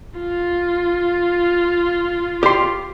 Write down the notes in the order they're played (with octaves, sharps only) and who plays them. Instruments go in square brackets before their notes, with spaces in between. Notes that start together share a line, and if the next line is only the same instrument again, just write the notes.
[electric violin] F4
[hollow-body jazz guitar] G4 C6